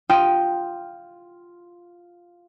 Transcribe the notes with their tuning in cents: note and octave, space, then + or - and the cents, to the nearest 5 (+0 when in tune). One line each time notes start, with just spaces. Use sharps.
F4 +0 G5 +0 D#6 +0